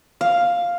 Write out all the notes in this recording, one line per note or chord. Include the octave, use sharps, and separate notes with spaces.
F5